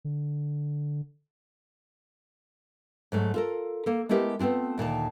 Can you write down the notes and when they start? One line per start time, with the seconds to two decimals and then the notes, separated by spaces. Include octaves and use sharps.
0.05 D3
3.12 G#2 F#3 A3
3.34 F4 A4 A#4
3.86 A#3 A4
4.09 G#3 A3 B3 E4 G4 A#4
4.39 A3 B3 C4 D4 F4
4.78 D2 A#2 D#3 A5